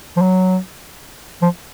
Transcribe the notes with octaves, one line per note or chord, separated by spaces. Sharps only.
F3
F#3
F3